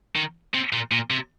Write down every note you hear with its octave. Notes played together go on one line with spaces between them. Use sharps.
D#3
C3
A#2
A#2
C3